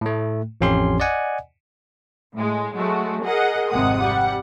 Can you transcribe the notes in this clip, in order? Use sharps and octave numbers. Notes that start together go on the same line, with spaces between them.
A2 A3
A1 F2 C#4 G4 C6
D5 D#5 F#5 G#5
A2 G#3
F#3 G#3 A3 F#4
G#4 A#4 D#5 F#5
G#1 F2 C3 G#3 F#5 D#6
G3 F#5